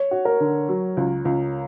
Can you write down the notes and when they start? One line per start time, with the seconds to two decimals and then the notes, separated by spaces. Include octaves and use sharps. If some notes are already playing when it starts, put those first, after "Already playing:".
Already playing: C#5
0.11 F#4
0.25 A#4
0.40 D3
0.69 F#3
0.97 C#2
1.25 C#2